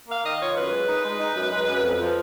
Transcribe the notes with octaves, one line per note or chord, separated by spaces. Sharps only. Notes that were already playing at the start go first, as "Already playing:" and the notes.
A#3 F5
D#3 D#5
F4 C#5
F#2 B4
G#3
D#4
G#3
D#4
F#2
G#3
F#2
F2
F3